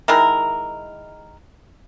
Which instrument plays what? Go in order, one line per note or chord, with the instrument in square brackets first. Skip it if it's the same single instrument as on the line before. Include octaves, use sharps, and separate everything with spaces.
[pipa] D#3 G#3 E4 A#4